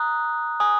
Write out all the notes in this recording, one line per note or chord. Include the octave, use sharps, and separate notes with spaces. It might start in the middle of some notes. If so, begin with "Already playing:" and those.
Already playing: A#5 D#6 F#6
G#5 D#6 F#6